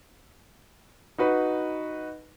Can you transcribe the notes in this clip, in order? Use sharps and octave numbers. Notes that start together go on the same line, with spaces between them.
D#4 F#4 B4